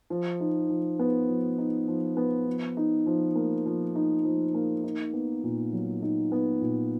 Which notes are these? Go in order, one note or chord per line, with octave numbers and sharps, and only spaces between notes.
F3
D#4
F3
B3
F3
D#4
F3
B3
F3
D#4
F3
A#3
F3
D#4
F3
A#3
D#4
B3
A#2
F#3
D#4
B3
A#2